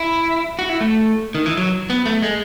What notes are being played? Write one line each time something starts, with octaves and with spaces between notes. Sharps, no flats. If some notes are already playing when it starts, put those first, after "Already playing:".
Already playing: E4
F#4
E4
A3
D#3
E3
F#3
B3
A3
G#3